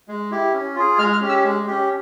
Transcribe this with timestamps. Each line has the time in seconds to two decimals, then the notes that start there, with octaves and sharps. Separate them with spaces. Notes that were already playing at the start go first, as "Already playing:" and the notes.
0.08 G#3
0.31 E4 G4
0.53 C#4
0.76 F4 G#4
0.98 G#3 F6
1.13 F6
1.21 C#4 G4
1.29 E6
1.44 G#3
1.67 C#4 G4